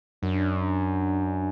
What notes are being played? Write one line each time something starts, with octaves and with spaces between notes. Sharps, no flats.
F#2 D4